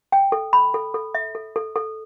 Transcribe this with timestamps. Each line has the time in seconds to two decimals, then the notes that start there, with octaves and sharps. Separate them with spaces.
0.12 G5
0.32 A4
0.53 B5
0.74 A4
0.94 A4
1.15 E5
1.35 A4
1.56 A4
1.76 A4